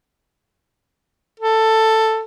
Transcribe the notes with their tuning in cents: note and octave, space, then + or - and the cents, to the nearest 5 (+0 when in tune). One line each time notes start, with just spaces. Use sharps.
A4 +10